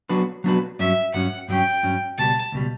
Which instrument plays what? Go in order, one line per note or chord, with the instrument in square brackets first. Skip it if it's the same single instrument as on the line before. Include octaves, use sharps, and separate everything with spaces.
[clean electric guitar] F#3 B3 D4 F#4 B4
F#3 B3 D4 F#4 B4
[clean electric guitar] G2 F#3 C#4 [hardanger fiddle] E5
[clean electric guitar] G2 F#3 C#4 [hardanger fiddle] F#5
[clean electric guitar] G2 F#3 C#4 [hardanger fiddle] G5
[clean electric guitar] G2 F#3 C#4
[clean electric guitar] C#2 B2 G3 [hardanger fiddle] A5
[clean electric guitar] C#2 B2 G3